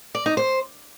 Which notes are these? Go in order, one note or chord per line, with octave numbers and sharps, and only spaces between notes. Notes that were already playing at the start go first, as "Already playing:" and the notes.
D5
D#4
C5